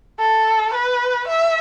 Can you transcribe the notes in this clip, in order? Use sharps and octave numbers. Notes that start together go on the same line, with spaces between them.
A4
B4
E5